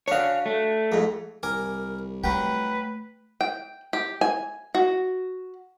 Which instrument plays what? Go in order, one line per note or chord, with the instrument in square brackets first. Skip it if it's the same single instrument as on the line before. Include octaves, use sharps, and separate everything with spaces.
[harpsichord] D4 F#4 [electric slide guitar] C#5 F5
[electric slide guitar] A3
[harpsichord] F2 G#2
[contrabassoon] C2 [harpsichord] A#4 G#5 D6
[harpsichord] F#3 G5 [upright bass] A3 [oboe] B4
[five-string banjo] G5
G4
G#5
F#4